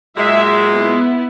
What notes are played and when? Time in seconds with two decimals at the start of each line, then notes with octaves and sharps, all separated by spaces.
0.17 A#2 F#3 G#3 E5
0.72 B3 E4